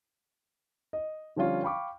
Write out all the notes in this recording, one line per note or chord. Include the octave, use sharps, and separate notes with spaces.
D#5
D3 F3 G3 C#4 F4
F5 G5 B5 C#6 D6